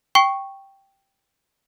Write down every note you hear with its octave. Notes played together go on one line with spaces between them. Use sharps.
G5 C#6 C7